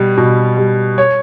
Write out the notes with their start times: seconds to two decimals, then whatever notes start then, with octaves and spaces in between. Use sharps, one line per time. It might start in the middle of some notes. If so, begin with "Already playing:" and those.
Already playing: B2 G3
0.17 B2
0.57 G3
0.98 C#5